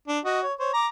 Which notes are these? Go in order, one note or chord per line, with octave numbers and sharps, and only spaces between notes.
D4
F#4 D#5
C#5
C5 C#5
A#5 D6